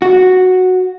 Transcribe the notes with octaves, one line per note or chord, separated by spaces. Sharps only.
F#4